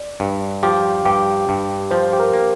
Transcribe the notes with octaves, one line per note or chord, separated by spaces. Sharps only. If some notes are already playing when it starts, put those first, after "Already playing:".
Already playing: D5
G2
F3 G4
G2 G4
G2
F3 C5
G4
A#4
A#3